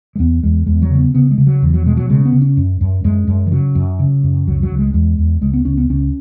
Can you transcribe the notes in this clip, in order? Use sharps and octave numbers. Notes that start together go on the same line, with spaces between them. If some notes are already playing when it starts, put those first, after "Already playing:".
G#3
E2 B3
E2 G#3
E2 G#3
F#3
C#3 G#3
B3
C#3 B3
G#3
C#3
F#3
E2 E3
F#3
B2 G#3
F#3
C#3 G#3
B3
C#3
C#4
F#2
F#2
F#2 G#3
F#2
E3
C#3 F#3
F#2
C#3
F#2
C#2 F#3
F#3
C#2
G#3
E2 G#3
E2
C#2 G#3
B3
C#2 C#4
B3
C#2 C#4